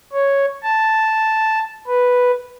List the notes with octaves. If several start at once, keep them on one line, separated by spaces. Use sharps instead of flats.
C#5
A5
B4